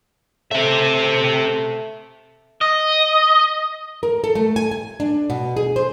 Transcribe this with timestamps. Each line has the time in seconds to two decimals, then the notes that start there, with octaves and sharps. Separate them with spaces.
0.51 A3 C4 E5
2.61 D#5
4.03 A#4
4.24 A4
4.35 A3
4.56 G#5
4.71 G#5
5.00 D4
5.30 B2
5.57 G#4
5.76 C5